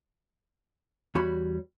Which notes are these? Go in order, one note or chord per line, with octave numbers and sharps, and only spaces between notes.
E2 G3 F#4 C#5 B5